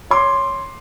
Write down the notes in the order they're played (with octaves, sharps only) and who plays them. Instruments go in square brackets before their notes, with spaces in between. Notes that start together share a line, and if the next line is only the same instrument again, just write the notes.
[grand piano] C#5 C6 D6